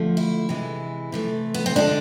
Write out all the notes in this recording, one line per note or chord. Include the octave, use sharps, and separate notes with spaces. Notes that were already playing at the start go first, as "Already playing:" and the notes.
Already playing: D3 F3 A3
E4
C3 E3 G#3
C3 E3 A3
B3
C4
D3 G#3 D4